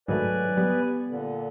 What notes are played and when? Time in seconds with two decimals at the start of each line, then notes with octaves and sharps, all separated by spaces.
0.08 G#2 D#3 F#3 A3 B4 D5 G#5
0.57 G3 B3
1.08 A#2 D3